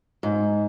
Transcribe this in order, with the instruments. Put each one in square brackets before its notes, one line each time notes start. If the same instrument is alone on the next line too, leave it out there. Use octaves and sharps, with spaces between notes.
[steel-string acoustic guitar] G#2 [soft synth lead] D#4